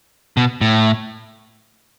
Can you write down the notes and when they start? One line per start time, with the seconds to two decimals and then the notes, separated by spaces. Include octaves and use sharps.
0.37 B2
0.61 A2